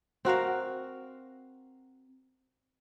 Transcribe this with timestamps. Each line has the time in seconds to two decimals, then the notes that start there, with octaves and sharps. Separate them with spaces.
0.25 C4 F#4 A#4 F5